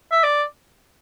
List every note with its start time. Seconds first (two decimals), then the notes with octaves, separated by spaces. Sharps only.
0.11 E5
0.23 D5